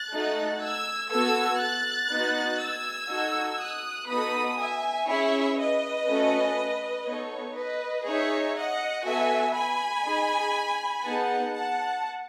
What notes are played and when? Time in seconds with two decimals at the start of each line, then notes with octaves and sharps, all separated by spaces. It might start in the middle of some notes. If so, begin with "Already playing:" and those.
Already playing: F#6 A6
0.11 A3 D#4 F#4 A4
0.61 E6 G#6
1.10 B3 F#4 A4 E6 G#6
1.60 F#6 A6
2.10 B3 D#4 F#4
2.59 E6 G#6
3.10 D#4 F#4 A4
3.59 D#6 F#6
4.09 B3 D#4 F#4 A4 B5 D#6
4.58 E5 G#5
5.08 C#4 E4 G#4 C#5 E5
5.58 B4 D#5
6.07 A3 C#4 F#4 A4
7.07 B3 D#4 A4 C#5
7.57 B4 D#5
8.06 D#4 G#4 C#5 E5
8.56 D#5 F#5
9.05 B3 F#4 A4 E5 G#5
9.55 G#5 B5
10.05 D#4 G#4
11.04 B3 D#4 G#4 F#5 A5
11.54 F#5 A5